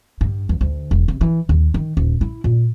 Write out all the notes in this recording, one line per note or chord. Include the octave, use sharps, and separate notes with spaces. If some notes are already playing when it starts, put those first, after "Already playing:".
G2
E2
D2
E1
C3
E3
D#2
D#3
D#1
E4
A#2